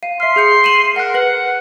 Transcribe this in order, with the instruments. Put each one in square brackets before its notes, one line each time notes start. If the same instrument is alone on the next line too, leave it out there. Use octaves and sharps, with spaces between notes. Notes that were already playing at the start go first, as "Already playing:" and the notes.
[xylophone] F5 D#7
[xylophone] E5 F6 [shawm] C6
[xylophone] G#4 G6 C#7
D#7 E7 F#7
[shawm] A#4 [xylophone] F#5 F#6
[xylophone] B4 F#7 [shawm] F#5